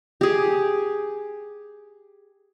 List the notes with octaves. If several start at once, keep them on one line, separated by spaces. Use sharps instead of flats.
G4 G#4